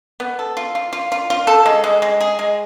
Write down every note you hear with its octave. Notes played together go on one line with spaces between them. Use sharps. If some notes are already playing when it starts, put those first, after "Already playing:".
B3
A4
F4
F4
F4
F4
F4
A4
G#3
G#3
G#3
G#4
G#3